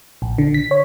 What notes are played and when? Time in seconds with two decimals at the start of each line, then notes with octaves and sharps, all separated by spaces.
0.22 A#1
0.38 D3
0.54 B6
0.71 C#5